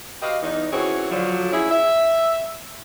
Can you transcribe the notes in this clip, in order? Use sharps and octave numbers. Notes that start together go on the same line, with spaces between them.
F#4 G4 B4 D#5 F5
E2 D#4
E3 C4 C#4 E4 F#4 G#4
D3 F3 F#3
C#4 E4 G#4
E5